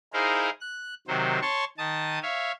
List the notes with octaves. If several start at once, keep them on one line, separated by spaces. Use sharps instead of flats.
D#4 E4 G#4 A#4 C5 F5
F#6
C3 D#3 F#3 C5
C#5 A5 C6 C#6
D#3 A5 D#6
C#5 E5 F5